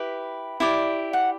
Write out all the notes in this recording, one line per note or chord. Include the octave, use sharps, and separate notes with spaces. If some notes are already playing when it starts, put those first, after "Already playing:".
Already playing: E4 G4 B4
E4 G4 D5
F#5